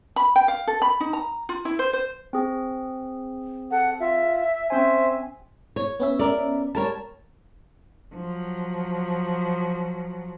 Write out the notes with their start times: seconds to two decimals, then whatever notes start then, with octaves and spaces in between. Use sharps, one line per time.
0.16 B5
0.36 G5
0.48 F5
0.67 A4
0.82 B5
1.00 D#4
1.13 A#5
1.49 F4
1.65 E4
1.79 C5
1.93 C5
2.33 C4 G#4
3.71 A4 F#5
4.00 F4 E5
4.70 C4 C#4 C5 E5 G#5
5.76 C#5
6.00 B3 C#4 E5
6.19 A#4 D5
6.75 G3 A#4 C#5 A5
8.15 F3 F#3